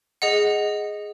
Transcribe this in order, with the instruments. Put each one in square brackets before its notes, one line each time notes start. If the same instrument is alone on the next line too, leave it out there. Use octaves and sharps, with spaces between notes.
[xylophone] G#4 D#5 F#5